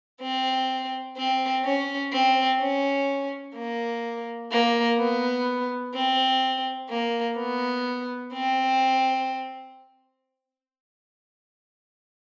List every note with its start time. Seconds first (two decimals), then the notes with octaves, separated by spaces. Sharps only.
0.22 C4
1.17 C4
1.65 C#4
2.13 C4
2.60 C#4
3.56 A#3
4.52 A#3
4.98 B3
5.95 C4
6.90 A#3
7.38 B3
8.34 C4